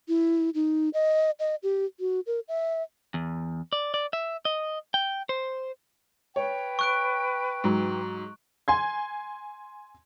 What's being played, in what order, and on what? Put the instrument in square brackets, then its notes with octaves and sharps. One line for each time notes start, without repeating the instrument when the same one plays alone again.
[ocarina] E4
D#4
D#5
D#5
G4
F#4
A#4
E5
[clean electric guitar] E2
D5
D5
E5
D#5
G5
C5
[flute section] B4 G5 [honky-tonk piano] C#5
[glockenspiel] C#6 F#6 D7
[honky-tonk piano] G#2 F#3
G#5 C6 G#6